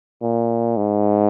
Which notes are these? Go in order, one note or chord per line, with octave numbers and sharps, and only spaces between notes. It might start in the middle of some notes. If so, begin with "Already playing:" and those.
A#2
G#2